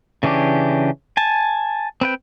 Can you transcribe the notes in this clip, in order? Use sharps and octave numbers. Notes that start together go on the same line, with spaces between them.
C#3 E3 C#4 D4 G4
G#5 A5
C4 B4 G5